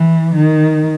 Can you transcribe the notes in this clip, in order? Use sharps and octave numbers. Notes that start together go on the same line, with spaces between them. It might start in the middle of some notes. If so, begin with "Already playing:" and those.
Already playing: E3
D#3